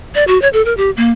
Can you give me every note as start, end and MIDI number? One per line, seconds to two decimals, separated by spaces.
0.15 0.24 74
0.27 0.40 66
0.42 0.49 73
0.53 0.64 69
0.65 0.76 70
0.77 0.91 67
0.97 1.12 58